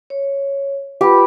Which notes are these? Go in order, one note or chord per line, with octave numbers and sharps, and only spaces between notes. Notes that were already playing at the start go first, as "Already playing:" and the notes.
C#5
F4 G4 B4 B5